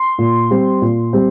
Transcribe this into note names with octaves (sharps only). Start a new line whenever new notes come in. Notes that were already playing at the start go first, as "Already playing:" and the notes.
Already playing: C6
A#2
G3 C4
A#2
G3 C4